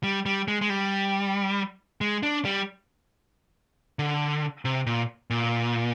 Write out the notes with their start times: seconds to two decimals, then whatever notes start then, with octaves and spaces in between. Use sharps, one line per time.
0.03 G3
0.26 G3
0.48 G#3
0.61 G#3
0.70 G3
2.01 G#3
2.23 D4
2.45 G3
3.99 D3
4.65 C3
4.86 A#2
5.30 A#2